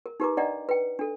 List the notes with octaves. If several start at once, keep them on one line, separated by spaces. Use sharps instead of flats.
A#4
D#4 G4 A#4 B4 A#5 D6
D4 D5 D#5 F#5 A#5
B4 G5
D4 A4